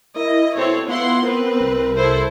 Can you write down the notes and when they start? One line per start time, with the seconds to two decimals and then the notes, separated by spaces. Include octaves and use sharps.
0.16 E4 A#4 D#5
0.55 B2 C4 A4 C#5
0.88 B3 E4 F4 F#5 C6
1.23 C4 A#4 B4
1.61 C2
1.97 E4 A4 C5